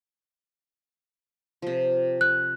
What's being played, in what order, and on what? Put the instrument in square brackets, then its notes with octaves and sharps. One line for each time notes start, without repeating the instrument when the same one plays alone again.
[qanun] C3 F3
[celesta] F#6